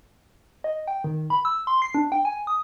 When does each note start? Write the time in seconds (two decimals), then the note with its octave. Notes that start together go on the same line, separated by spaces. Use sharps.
0.64 D#5
0.88 G5
1.04 D#3
1.30 B5
1.45 E6
1.67 C6
1.82 C7
1.95 D4
2.12 G5
2.25 G#5
2.47 D#6